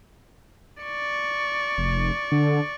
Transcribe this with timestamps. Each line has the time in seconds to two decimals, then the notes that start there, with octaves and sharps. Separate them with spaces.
0.83 D5 C#6
1.78 F1
2.32 D3